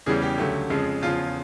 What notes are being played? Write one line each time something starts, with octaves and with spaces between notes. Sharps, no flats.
E2 C#3 E3 G3 G#4
G4
D2 C#3 F#3 A3
F2 C#3 F3 G#3
E2 C#3 F3 F4